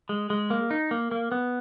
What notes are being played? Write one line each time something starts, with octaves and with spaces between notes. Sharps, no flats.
G#3
G#3
A#3
D#4
A#3
A#3
B3